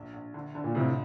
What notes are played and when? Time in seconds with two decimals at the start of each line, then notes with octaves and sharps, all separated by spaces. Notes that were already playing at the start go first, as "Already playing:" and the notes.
Already playing: A#1
0.14 A#1
0.34 D3
0.55 D3
0.64 A#2
0.75 F2 A2 C3